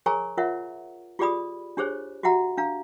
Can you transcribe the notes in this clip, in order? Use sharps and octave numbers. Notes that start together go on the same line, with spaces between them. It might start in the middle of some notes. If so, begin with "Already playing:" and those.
G#4 A#4 C#5 G#5 A#5 C#6
F4 A#4 C#5 E5 F#5
F4 G4 G#4 D5 B5 D#6
D4 G4 G#4 C5 C#5
F#4 G4 E5 F#5 A#5
D4 F5 A#5